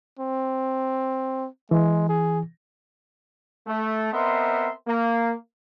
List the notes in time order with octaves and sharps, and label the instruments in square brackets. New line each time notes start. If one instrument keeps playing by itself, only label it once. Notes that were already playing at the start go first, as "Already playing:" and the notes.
[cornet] C4
[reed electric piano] E3 [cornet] G#3
[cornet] G#4
[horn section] A3
B3 C4 A#4 D#5 E5 C6
A#3